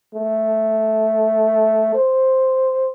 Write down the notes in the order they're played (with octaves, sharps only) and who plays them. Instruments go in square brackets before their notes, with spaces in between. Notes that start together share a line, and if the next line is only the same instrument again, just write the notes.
[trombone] A3
C5